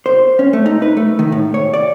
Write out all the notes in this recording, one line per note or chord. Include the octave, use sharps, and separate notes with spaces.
C5
C#4
A3
D#4
B4
A3
D#3
A2
C#5
D5